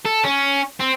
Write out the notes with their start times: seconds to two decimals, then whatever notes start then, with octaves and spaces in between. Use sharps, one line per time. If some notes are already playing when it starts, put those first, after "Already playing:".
0.05 A4
0.24 C#4
0.80 C4